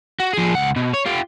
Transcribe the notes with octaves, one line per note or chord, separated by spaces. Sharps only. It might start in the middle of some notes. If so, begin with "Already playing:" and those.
F#4
F3 G#4
C#2 F#5
B2
C#5
F4 G4